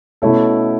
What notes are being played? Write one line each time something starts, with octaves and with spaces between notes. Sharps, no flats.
B2 A3 C#4 E4 A4